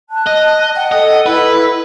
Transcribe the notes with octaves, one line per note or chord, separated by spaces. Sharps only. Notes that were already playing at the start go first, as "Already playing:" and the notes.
A5 F#6
D#5
F#5 G5 A5
A4 D#5
E4 B4